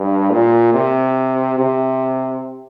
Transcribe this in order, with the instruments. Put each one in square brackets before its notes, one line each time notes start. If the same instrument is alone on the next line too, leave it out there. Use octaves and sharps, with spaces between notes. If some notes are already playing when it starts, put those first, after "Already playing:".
Already playing: [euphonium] G2
A#2
C3
C3